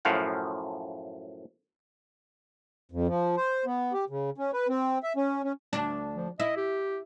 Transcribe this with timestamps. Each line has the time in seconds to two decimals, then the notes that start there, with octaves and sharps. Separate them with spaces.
0.05 F#2 A2 F3 F5 F#5
2.92 F2
3.07 F3
3.37 C5
3.65 B3
3.93 G4
4.09 C#3
4.38 C#4
4.53 B4
4.68 C4
5.03 E5
5.16 C#4
5.43 C#4
5.73 D2 D4
6.15 F3
6.40 E4 D#5
6.57 G4